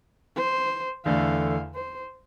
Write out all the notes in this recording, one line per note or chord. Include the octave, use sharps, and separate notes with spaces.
C5
E2 D3 A3 F5
C5